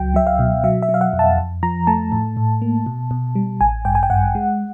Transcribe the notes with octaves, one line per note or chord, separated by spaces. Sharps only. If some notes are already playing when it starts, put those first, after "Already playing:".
Already playing: C#2 F#3 G5
F#3 E5
F5
B2
F#3 E5
E5
F#3
F5
F#5
F2
A5
F2
F3 A#5
A3 A5
A2
A2
A#3
B2
B2
G3
A1 G#5
G2 G5
G#5
G5
G2 F#5
G#3